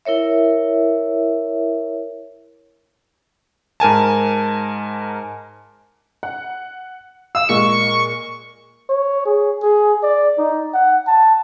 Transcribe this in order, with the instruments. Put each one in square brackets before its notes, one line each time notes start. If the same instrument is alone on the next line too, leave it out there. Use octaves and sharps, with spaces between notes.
[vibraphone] E4 A#4 C#5 E5
[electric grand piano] G#2 A#4 G#5 A5
[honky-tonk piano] F#5
[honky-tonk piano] F5 D#6 [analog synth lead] E6
[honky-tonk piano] A#2 G#3 A#3 [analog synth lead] C#6
[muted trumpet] C#5
G#4
G#4
D5
D#4
F#5
A5